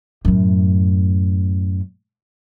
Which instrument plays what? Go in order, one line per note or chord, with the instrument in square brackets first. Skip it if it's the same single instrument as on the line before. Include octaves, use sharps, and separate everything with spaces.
[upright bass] F#2 A2